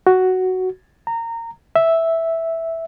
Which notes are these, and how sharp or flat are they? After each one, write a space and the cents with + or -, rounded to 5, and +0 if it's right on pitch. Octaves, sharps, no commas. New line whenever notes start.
F#4 +5
A#5 -20
E5 -5